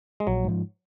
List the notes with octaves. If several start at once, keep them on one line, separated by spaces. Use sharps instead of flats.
G#3
A#1 F#3
G#2 F3